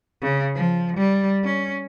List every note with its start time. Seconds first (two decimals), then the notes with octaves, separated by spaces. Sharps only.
0.22 C#3
0.55 F3
0.97 G3
1.45 C#4